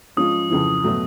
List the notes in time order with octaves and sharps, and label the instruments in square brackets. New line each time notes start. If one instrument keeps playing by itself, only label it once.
[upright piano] F3 G#3 C#4 F4 [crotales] D#6
[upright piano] F2 C#3 E3
B2 F#3 A3